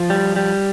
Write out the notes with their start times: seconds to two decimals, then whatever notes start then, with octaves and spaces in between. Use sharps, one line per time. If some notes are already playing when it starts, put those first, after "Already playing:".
Already playing: F3 F4
0.10 G3
0.36 G3